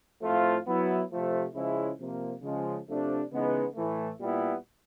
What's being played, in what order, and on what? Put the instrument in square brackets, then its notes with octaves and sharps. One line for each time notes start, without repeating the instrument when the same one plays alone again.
[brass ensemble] A2 F3 A3 C4 F4
F#3 B3 E4
C3 F3 A3
C#3 F3 G#3 C#4 E4
C3 F3 A#3
C#3 F3 G#3
C3 F3 A3 D4
C#3 E3 G#3 B3 D#4
A2 E3 A3
A#2 G3 B3 E4